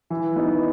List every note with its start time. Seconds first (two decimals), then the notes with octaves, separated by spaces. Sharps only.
0.10 E3
0.36 B3 D#4